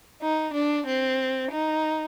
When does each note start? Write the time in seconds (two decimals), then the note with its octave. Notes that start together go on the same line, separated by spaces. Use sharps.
0.22 D#4
0.54 D4
0.87 C4
1.51 D#4